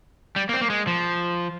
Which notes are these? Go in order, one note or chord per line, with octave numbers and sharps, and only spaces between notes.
G3
A#3
C4
A#3
G#3
F3